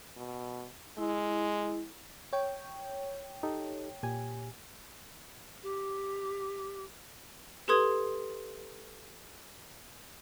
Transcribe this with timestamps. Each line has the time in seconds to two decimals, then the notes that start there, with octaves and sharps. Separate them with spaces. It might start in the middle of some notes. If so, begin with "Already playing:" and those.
0.17 B2
0.98 G#3 E4
2.33 C#5 G5
3.43 D#4 G4 A4
4.03 A#2 G4 G#5
5.63 G4
7.68 G4 A4 B4 C6 D#6 G#6